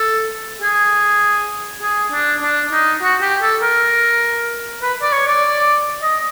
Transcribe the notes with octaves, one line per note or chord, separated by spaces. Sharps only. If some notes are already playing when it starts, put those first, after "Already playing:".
Already playing: A4
G#4
G#4
D4
D4
D#4
F#4
G4
A4
A#4
B4
D5
C#5
D5
D#5